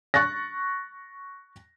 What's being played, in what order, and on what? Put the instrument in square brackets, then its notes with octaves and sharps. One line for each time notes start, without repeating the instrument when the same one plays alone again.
[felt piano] C#6 F#6 A6 A#6